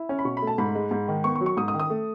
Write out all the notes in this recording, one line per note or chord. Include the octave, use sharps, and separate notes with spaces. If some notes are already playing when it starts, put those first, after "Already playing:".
Already playing: E4
C#4
B5
B2 C#6
B5
A3
A5
G#2 B5
G#3
G#2
D#3
B3 C#6
C#6
F#3
C#6
G#2 D#6
D#6
D#3
D#6
A3